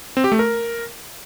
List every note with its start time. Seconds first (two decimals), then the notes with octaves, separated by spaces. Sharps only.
0.17 C4
0.24 G4
0.32 A3
0.39 A#4